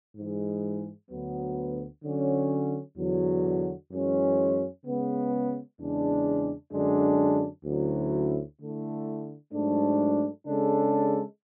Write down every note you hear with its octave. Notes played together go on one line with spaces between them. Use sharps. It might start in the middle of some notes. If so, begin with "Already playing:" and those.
G#2 E3 G#3
D2 D3 F#3 B3
D3 F#3 C#4
E2 D3 F#3
F#2 E3 G#3 C#4
C#3 G#3 B3
E2 C#3 G#3 D4
F#2 D3 G#3 D4
D2 D3 F#3 C#4 E4
D3 A3 E4
G#2 F#3 A3 D4
C#3 G#3 D4 A4